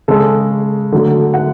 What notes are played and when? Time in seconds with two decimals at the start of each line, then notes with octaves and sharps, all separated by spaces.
0.08 C#3 G#3 A4
0.92 D3 F#3 A3
1.34 F#5